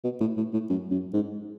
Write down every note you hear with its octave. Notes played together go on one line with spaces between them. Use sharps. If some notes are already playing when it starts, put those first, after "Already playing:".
B2
A2
A2
A2
F#2
F#2
G#2